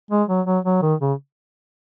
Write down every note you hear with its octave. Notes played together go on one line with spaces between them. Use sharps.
G#3
F#3
F#3
F#3
D#3
C#3